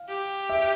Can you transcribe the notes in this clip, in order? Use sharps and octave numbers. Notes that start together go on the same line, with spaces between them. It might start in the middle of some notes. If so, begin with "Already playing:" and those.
Already playing: F5
G4
E5